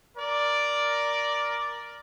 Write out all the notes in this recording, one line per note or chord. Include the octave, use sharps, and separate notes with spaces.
A#4 D5